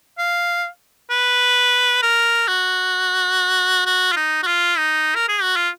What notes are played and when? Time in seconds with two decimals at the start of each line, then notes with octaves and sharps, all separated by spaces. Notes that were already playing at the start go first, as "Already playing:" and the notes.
0.18 F5
1.10 B4
2.02 A#4
2.48 F#4
3.86 F#4
4.12 F4
4.16 D#4
4.43 F#4
4.47 F4
4.77 D#4
5.15 A#4
5.28 G#4
5.42 F#4
5.56 F4